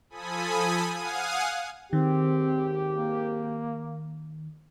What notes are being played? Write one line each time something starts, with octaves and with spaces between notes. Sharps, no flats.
F3 A4 G#5 B5 D#6
F5 F#5 G#5 D#6
G#1 D#2 D#3 C4 G4
A#3